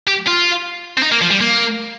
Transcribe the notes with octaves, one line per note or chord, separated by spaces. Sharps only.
G4
F4
C4
D#4
A#3
F3
G3
A#3